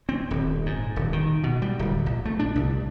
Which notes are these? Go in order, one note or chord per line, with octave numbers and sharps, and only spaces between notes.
C4
D#1
G#2
D#1
D#3
B2
G3
D1
A#1
A3
D4
C2